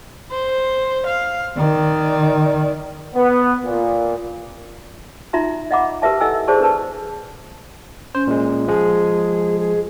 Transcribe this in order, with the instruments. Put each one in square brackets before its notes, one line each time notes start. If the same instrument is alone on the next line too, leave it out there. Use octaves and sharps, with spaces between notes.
[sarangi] C5
F5
[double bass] D#3 [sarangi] D5
[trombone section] B3
A#2
[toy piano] D#4 F4 E5 A#5 C6
D#5 E5 F#5 A#5 B5 D6
G4 A#4 B4 E5 A5
E4 A4 D#5 F#5 G#5 E6
G#4 C5 D5 A5 C#6
D4 A#4 B4 A5
[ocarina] C#4 [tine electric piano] C5
[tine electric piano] A#2 G#3
[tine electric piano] F3 G#3 [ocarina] G#4
[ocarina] G#4